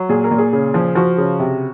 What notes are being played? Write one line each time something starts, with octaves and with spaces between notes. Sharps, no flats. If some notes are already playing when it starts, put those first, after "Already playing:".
Already playing: F#3
A#2 G#4
A#4
A#2
G#4
C#3
F3
F3 F#4
C#3
C3